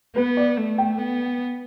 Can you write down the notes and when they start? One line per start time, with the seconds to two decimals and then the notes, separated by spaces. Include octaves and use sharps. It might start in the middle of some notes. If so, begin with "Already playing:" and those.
0.16 B3 B4
0.37 D5
0.57 A3
0.78 G5
0.98 B3